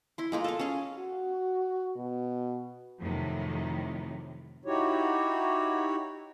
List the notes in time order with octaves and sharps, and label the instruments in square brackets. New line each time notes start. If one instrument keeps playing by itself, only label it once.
[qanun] E4 C6
G#3 A#3 F4
A4 F5
C#4 G#4
[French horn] F#4
B2
[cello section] F2 A2 C3 D#3 F#3
[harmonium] D#4 E4 F#4 G4 C#5